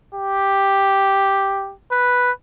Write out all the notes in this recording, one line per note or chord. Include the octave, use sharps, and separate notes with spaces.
G4
B4